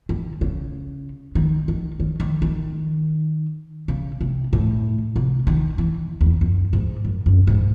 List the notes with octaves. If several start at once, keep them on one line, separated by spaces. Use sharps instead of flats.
D#3
C#3
D#3
D#3
D#3
D#3
D#3
C#3
C3
A2
C3
D#3
E3
E2
F#2
G#2
F#2
F#2
G#2